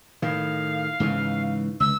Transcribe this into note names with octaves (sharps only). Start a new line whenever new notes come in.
A2 D#3 F5
G#2 C#3 E3
C#2 E6